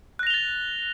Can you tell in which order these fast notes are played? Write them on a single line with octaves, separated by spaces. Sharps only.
F#6 A#6 F7 G7 A6